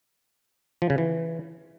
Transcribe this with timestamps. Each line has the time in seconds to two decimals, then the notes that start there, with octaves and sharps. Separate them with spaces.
0.82 F3
0.90 C#3
0.98 E3